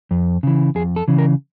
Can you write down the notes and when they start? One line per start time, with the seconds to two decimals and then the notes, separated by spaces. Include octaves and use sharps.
0.11 F2
0.43 C#3 E3
0.75 F2 G#4
0.96 A4
1.08 C#3 E3
1.18 A#4